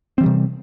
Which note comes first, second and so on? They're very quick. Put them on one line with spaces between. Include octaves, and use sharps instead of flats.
C4 E3 G3 C3